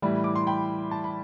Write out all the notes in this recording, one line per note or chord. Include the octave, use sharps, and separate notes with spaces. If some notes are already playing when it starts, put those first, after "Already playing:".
A2 E3 G3
D6
C6
G5 B5
A5
B5